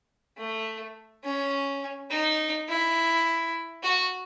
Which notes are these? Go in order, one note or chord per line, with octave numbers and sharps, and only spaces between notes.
A3
C#4
D#4
E4
F#4